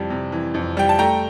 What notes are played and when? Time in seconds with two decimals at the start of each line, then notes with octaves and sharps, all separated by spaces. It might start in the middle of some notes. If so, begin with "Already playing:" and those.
Already playing: F2 C3 E3 G3 A5
0.10 C3
0.32 E3
0.54 F2
0.77 G3 G5
0.89 A5
0.99 A3 G5 A#5